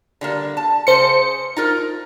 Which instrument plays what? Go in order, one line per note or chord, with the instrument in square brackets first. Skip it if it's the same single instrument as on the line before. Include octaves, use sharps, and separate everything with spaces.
[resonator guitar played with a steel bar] D3 G3 A#3
A5
[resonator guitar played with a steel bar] C#3 [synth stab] C5 C#7
[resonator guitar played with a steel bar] D#4 F4 A#4